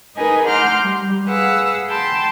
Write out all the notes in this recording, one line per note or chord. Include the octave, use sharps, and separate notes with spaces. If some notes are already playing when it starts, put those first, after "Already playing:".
D#4 G#4 A#4 B4 D#5 G#5
F#5 A#5 C6 D6 F6 G6
G3
G#4 B4 F5 F#5 E6
G5 A5 B5 C6